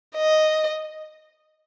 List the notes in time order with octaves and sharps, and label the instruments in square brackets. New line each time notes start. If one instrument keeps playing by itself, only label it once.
[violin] D#5